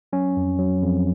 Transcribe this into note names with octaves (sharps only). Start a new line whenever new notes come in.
F#3 C#4
F2
F#3
F2